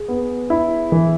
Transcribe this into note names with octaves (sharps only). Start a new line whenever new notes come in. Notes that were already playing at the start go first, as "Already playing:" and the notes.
Already playing: G#4
B3
E4
E3